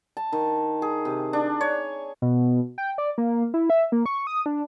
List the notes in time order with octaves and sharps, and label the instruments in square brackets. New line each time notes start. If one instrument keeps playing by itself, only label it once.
[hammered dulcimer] A5
D#3
G#4
C3
D4
C#5
[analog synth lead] B2
G5
D5
A#3
E4
E5
A#3
C#6
D#6
D4